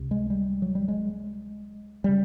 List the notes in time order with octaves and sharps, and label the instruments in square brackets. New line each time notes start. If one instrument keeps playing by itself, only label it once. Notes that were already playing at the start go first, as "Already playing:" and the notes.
Already playing: [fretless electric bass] C#2 C3
G#3
G3
F#3
G3
G#3
C#3 G3